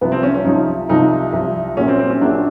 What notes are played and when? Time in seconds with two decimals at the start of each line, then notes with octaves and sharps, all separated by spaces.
0.01 C2 C3 F3 B3
0.12 C4
0.23 C#4
0.34 C#4
0.45 C2 C3 F3 D#4
0.89 C2 C3 F3 D#4
1.33 C2 C3 F3
1.77 A#1 A#2 F#3 C#4
1.88 C4
1.99 C4
2.10 C#4
2.21 A#1 A#2 F#3 D4